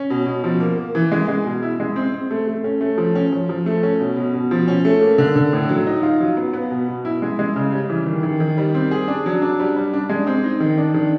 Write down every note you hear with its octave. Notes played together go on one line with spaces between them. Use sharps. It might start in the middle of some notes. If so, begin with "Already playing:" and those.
Already playing: C#4
B2
B2
F3
A#3
A#3
E3
G#3
G#3
B2
E4
G#3
C4
C4
A3
A3
C#4
A3
F3
C#4
F3
F3
A3
C#4
B2
B2
B2
F3
C#4
A3
A#3
D3
D3
A2
F#3
D#4
F4
F#3
B3
B3
B2
B2
E4
G#3
G#3
C#3
G3
E3
D#3
D#3
D#3
G3
C4
G#4
D4
F#3
D4
G3
G3
D4
G#3
C4
D#4
D#3
D4
D#3